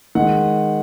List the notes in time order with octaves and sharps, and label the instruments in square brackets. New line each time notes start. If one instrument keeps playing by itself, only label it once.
[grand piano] D#3 G#3 F#5